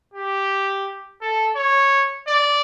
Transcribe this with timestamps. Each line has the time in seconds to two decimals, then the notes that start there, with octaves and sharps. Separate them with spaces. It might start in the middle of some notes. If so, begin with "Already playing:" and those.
0.14 G4
1.21 A4
1.56 C#5
2.28 D5